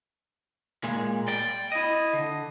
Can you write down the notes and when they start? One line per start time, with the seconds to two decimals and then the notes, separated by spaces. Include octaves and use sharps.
0.84 A#2 G#3
1.28 D5 G5
1.72 E4 D#5
2.13 D3